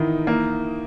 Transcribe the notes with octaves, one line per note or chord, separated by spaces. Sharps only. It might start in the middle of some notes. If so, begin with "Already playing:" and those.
Already playing: D#3 E3 D#4 E4
A#3